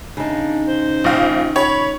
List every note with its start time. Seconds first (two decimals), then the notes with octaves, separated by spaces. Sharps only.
0.17 C#3 D4 D#4
0.67 C5
1.04 A#1 F5
1.56 C#5 B5